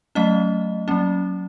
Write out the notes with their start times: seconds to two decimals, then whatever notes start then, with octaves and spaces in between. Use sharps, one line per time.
0.15 F#3 A3 C#4 D#5
0.88 F#3 A#3 C#4